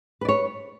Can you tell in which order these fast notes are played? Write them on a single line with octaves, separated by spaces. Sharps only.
B4 D5 C#5